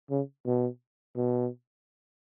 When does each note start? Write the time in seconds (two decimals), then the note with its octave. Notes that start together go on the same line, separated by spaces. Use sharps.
0.11 C#3
0.46 B2
1.16 B2